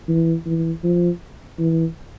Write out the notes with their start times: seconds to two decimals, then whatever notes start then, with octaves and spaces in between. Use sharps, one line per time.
0.08 E3
0.46 E3
0.84 F3
1.59 E3